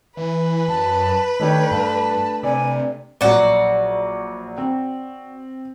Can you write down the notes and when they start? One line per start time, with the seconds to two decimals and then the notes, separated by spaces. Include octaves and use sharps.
0.17 E3 B4
0.68 F#2 A5
1.40 D#3 A3 D4 G4 C#5
1.71 G2 A5
2.43 C3 D5 G#5
3.21 A#1 F#3 F#4 D5
4.58 C4